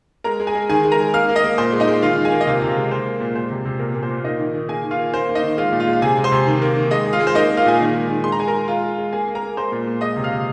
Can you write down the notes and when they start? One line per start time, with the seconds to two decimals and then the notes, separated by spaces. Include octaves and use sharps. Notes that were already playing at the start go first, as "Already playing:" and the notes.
0.24 G#3 A#4 A#5
0.40 G#3
0.47 G#4 G#5
0.55 G#3
0.69 D#3 G#4 G#5
0.84 G#3
0.92 A#4 A#5
0.99 G#3
1.13 A#3 F5 F6
1.29 A#3
1.36 D#5 D#6
1.44 A#3
1.58 A#2 C5 C6
1.72 G#3
1.80 D#4 D#5
1.88 G#3
2.02 D#3 F4 F5
2.17 D#3
2.25 G#4 G#5
2.32 A#3
2.41 D#5
2.47 C3 F4 F5
2.62 C3
2.76 G#3
2.91 A#3 C5
3.06 A#3
3.20 A#2
3.35 G#3 C5
3.50 C3
3.65 C3
3.80 A#2 A#4
3.95 A#2
4.03 C5
4.10 A#2
4.24 A#3 D#4 D#5
4.39 D#3
4.54 D#3
4.69 A#3 G#4 G#5
4.84 D#3
4.91 F4 F5
4.99 A#3
5.13 A#3 C5
5.28 A#3
5.35 D#4 D#5
5.43 D#3
5.57 G#3 F4 F5
5.72 A#2
5.80 F4 F5
5.87 G#3
5.93 F5
6.02 C3 G#4 G#5
6.17 G#3
6.24 C5 C6
6.32 C3
6.47 D#3
6.62 A#3
6.76 D#3
6.91 G#3 D#5 D#6
7.06 G#3
7.13 F4 F5
7.20 G#3
7.27 C5
7.35 A#3 D#4 D#5
7.50 A#3
7.57 F4 F5
7.65 A#2 G#4 G#5
7.80 D#3
7.95 G#3
8.09 D#3
8.24 G#3 C6
8.32 A#5
8.39 G#3 G#5
8.48 A#4 A#5
8.53 G#3
8.68 G#3 F4 F5
8.83 G#3
8.98 G#3
9.13 A#3 G#4 G#5
9.28 A#3
9.35 A#4 A#5
9.43 A#3
9.57 G#3 C5 C6
9.72 A#2
9.87 A#2
10.01 G#3 D#5 D#6
10.16 C3
10.24 F5 F6
10.31 C3